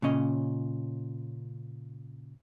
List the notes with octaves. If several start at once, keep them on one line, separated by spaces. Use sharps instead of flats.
A#2 C#3 C#4 D#5